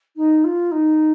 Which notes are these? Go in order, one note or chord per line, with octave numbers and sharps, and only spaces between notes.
D#4
F4
D#4